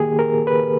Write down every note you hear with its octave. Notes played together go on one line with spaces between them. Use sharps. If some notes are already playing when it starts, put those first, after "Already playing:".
Already playing: D#3 A#3 G4 G#4
A#4
B4